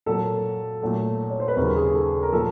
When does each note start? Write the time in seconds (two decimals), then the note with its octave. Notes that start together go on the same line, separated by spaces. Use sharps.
0.06 A#2 F#3 A#3 A4
0.82 A#2 F#3 A3
1.30 C#5
1.40 C5
1.48 B4
1.57 D#2 C#3 F#3 A#4
1.76 G#4
1.95 A4
2.23 A#4
2.32 A#2 F3 A4